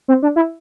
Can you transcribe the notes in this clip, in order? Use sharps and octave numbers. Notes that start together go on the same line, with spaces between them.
C4
D4
E4